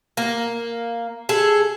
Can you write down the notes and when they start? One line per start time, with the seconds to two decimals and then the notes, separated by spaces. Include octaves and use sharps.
0.17 A#3
1.29 G#4 A4